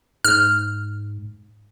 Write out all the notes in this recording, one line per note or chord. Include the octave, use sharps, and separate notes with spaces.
G#2 F6